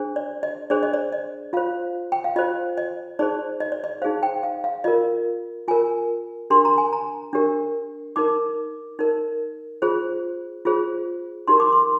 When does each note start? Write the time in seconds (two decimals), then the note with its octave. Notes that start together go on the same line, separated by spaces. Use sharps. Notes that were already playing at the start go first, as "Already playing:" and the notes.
Already playing: D4 G#4 C5
0.16 D5
0.43 D#5
0.70 D4 G#4 C5 D5
0.83 D#5
0.94 D5
1.12 D#5
1.53 F4 C5 F5
2.12 G5
2.24 F5
2.36 F4 C5 D#5
2.77 D#5
3.19 D#4 G#4 C5 D5
3.60 D#5
3.72 D5
3.84 D#5
4.02 D#4 G#4 C5 F5
4.23 G5
4.43 F5
4.64 F5
4.84 F4 A#4 D#5
5.68 F4 A#4 G#5
6.50 D4 G4 A#4 C6
6.65 A#5
6.78 G#5
6.93 A#5
7.33 D4 G4 A#4
8.16 D#4 A#4 D6
8.99 D#4 A#4
9.82 F4 G#4 C5
10.65 F4 G#4 C5
11.48 D#4 G4 A#4 C6
11.60 D6
11.72 C6